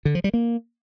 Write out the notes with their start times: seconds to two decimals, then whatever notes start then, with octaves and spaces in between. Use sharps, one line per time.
0.05 D3
0.15 F3
0.24 G3
0.34 A#3